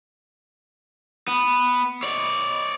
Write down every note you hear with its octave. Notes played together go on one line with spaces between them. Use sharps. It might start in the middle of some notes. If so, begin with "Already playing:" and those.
B3
C#5 D5